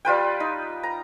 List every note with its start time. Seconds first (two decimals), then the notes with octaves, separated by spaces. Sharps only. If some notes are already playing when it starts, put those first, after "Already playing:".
0.05 G3 F4 B4 G5
0.40 D#4
0.83 A#5